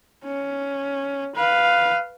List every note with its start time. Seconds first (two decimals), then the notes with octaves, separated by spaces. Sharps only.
0.24 C#4
1.35 B4 F5